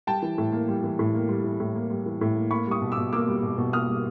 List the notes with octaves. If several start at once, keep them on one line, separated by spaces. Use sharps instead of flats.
G3 G5 A5
E3
A2
A#3
G3
E3
A2
A#3
G3
E3
A2
A#3
G3
E3
A2
A#3
A#3 B5 C#6
G3 C#6 D#6
B2
D6 E6
B2
A#3 D6 E6
G3
B2
B2
A#3 D#6 F6
G3